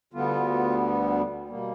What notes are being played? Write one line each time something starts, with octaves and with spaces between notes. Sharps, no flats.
D2 D3 G3 B3 F4
B2 G3 A#3